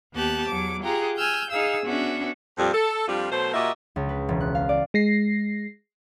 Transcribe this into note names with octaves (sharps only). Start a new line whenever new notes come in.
D#2 B3 G4 A5 F#6
E2 F#3 D6
F4 G4 G#4 F#5 A#5
G#5 E6 F6 G6
D#4 G#4 F5 E6
B3 C#4 D4 F#4 E5
F2 A#2 G3
A4
F2 G3 D4 F4
B2 F#3 A3 C5
A#2 A#3 F#4 G4 D#5 E5
C#2
B4
E1
F#6
F5
D5
G#3 A#6 C7